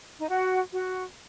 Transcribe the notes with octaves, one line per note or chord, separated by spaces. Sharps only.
D#4
F#4
F#4